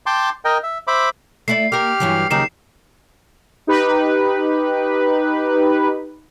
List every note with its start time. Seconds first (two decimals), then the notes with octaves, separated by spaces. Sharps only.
0.06 G5 A5 C6 D6
0.45 A#4 D#5 G5
0.63 E5
0.87 C5 E5 B5 D6
1.48 A3 E4 D5 C7
1.72 A#3 G4 A#4 F6
2.00 G2 E3 F#3
2.30 D#2 C#3 F#3 D#4 G4 A#4 C7 E7
3.67 D#4 G4 B4